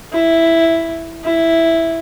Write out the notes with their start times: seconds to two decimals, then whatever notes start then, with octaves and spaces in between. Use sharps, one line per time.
0.13 E4
1.25 E4